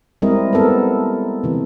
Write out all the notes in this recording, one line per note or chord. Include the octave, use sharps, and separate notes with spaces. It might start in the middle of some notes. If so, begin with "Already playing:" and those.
G3 G#3 C4 E4 A#4 D#5
B3 C4 A4 A#4
C3 E3